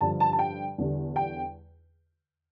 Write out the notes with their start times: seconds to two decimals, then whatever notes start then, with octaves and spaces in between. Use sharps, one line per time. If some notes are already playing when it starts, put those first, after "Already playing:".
0.01 G2 D3 F3 A5
0.20 A5
0.33 A5
0.39 G5
0.78 E2 D3 G3
1.16 G5